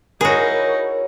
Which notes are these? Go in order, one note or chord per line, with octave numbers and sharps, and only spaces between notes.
D#4 E4 F#4 G#4 A#4 C#5 B5